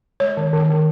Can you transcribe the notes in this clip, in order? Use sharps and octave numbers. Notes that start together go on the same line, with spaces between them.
G#3 C#5
D#3
D#3
D#3